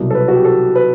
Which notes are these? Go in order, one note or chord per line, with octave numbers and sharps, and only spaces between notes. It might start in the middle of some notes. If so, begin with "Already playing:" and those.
Already playing: C2 B2 F#3
A4
B4
F#4
G4
A4
B4